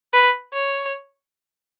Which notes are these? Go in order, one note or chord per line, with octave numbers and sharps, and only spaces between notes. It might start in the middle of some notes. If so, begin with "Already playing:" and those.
B4
C#5